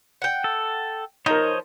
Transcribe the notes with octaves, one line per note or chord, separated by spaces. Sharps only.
F#5 G5
A4
F3 D#4 A#4 C5 C#5 D#5